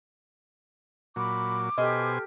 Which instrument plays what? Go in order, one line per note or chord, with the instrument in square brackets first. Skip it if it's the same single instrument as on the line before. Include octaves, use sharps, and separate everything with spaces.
[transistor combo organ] A#2 F#3 [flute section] B5 [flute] D6
[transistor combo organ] B2 C5 G#5 [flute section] G4 A4 F6 [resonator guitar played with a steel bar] D#5